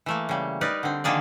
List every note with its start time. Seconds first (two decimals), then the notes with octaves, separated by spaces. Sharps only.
0.06 E3 A3 A#3
0.29 C#3 G3
0.61 D#4 A#4 B4 D5
0.83 D3 C4
1.04 D3 D#3 F3 A#3 G#4 D5